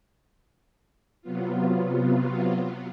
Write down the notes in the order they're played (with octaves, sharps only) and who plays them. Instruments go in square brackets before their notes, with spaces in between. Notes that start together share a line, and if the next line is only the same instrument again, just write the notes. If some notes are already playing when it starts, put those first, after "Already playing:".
[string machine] C3 F#3 B3 F4